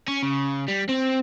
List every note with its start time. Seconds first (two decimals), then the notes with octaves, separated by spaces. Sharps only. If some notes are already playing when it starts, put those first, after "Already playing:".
0.08 C#4
0.23 C#3
0.68 G3
0.89 C4